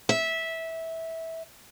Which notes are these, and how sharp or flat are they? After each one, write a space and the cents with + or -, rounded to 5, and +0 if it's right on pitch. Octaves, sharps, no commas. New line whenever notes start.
E5 -15